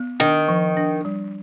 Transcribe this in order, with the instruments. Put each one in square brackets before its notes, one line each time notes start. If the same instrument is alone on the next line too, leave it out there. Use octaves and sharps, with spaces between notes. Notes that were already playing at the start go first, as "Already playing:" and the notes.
Already playing: [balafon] B3
[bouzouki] D#3 [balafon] D4
[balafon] F3
D4
G3